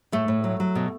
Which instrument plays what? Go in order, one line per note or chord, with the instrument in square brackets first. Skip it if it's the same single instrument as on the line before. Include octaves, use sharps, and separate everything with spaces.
[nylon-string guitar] A2 A3
A2
F#3
F#3
B2